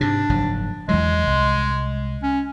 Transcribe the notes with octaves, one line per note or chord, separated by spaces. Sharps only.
G#2 C3 D4
F#1 G#2 F3
E2 E3 F#3 G#3
C2
C#4